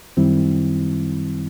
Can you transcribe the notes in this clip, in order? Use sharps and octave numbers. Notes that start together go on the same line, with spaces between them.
F#2 D#3 G3 C4 E4